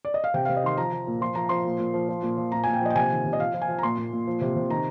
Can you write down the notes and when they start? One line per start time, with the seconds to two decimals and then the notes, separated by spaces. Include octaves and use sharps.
0.05 D5
0.14 D#5
0.24 F5
0.34 C3 G5
0.45 F5
0.49 C3
0.57 D#5
0.64 D#3 C6
0.77 F3 A#5
0.92 F3
1.07 A#2
1.21 F3 C6
1.35 F3 A#5
1.49 F3 C6
1.65 A#2
1.79 A#2
1.94 F3
2.09 F3
2.23 A#2
2.38 F3
2.52 A#2 A#5
2.64 G#5
2.66 A#2
2.73 G5
2.81 F3 D#5
2.90 G5
2.95 C3 G#5
3.11 D#3
3.26 C3
3.33 D#5
3.40 F3 F5
3.54 F3
3.62 G#5
3.68 F3
3.79 A#5
3.83 A#2 C6
3.97 A#2
4.13 A#2
4.27 F3
4.41 C3
4.56 C3
4.70 D#3 A#5